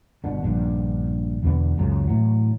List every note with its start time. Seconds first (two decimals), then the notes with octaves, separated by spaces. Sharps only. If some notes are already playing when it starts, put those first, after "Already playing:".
0.24 G1 B2 D3
0.43 A#1 G2 D3
1.43 E2 B2 D3 B3
1.78 C#2 F#2 C#3
2.07 A2 E3 F#3